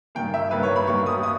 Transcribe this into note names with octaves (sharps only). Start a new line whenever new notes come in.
G2 D#3 A#3 G5
E5
G2 D#3 A#3 B4
C#5
B5
G2 D#3 A#3 C#6
D#6
D#6